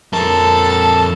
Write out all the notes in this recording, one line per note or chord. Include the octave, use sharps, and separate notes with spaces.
F2 A4 A#4 A5